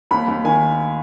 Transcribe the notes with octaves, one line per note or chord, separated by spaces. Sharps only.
D#2 B5
D#2
D#3 G#5